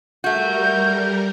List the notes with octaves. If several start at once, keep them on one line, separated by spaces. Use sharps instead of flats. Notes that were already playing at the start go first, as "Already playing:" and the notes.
G3 A3 F#4 A#4 G6